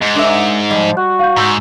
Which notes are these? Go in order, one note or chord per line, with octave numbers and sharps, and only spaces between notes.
G#2
D4 A#4 E5
F3 G3 D#5
F#4 F#6
F5 G6
G#2 A#5 E6 G6